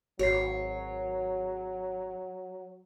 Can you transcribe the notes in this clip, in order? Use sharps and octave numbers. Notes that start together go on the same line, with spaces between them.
G#1 F#3 F#4 C#5 C7